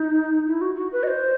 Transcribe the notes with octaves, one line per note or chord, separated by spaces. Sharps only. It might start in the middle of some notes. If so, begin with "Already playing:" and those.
Already playing: D#4
E4
F#4
F#4
B4
D#5
C5